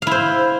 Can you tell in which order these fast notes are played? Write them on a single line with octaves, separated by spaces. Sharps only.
F5 E4 C5